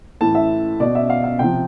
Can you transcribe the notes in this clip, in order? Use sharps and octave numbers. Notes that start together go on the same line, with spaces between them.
A2 E3 A5
E5
B2 D5
E5
F5
F5
C3 F3 G5